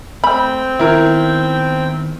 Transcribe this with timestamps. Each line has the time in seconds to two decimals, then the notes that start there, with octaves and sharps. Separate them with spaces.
0.24 A3 C4 G5 B5
0.79 D#3 B3 E4 A#4